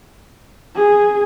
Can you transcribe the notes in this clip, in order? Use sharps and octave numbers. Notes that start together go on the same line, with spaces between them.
G#4